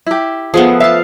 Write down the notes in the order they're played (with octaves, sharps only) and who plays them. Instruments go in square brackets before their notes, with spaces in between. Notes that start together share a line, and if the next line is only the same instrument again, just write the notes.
[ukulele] E4 G4
[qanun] F3 A3 B3 [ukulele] G#4 F#5
[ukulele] E5 [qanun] F5 A5